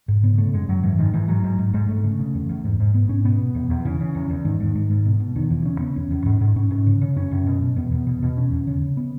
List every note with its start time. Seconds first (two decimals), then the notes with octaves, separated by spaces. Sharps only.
0.08 G#2
0.23 C#3 B3
0.38 C#3 A3
0.53 F#2 G#3
0.69 F#2 F#3
0.83 G#2 E3
0.98 G#2 D#3
1.13 G#2 E3
1.28 G#2 F#3
1.43 G#2
1.58 G#2
1.74 G#2 G#3
1.89 G#2 A3
2.04 C#3 A3
2.19 C#3
2.34 E2
2.49 E2
2.64 G#2
2.80 G#2
2.94 G#2 B3
3.09 G#2 C#4
3.25 B2 B3
3.40 B2
3.55 E2
3.70 E2
3.85 C#3 E3
4.00 C#3
4.15 E2
4.29 E2
4.45 G#2 D#3
4.60 G#2
4.75 G#2
4.90 G#2
5.05 B2
5.20 B2
5.35 E2 D#3
5.50 E2 E3
5.65 C#3 C#4
5.80 C#3 B3
5.96 E2 C#4
6.10 E2
6.26 G#2
6.41 G#2
6.56 G#2 C#4
6.71 G#2
6.86 C#3
7.01 C#3
7.16 F#2 C#4
7.31 F#2
7.46 B2
7.62 B2
7.76 E2 B3
7.91 E2
8.07 B2
8.22 B2
8.37 E2 C#4
8.52 E2
8.67 C#3
8.82 C#3
8.97 B3